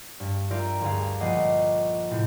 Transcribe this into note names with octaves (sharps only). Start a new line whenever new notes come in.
G2 D4
F4 G4 A#4 D5 E5
D2 G2 G#4 F5
A#1 A3 D#5 F#5 D6 C7
A2 C3